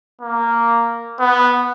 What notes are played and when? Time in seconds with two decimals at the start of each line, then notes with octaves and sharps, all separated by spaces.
0.21 A#3
1.19 B3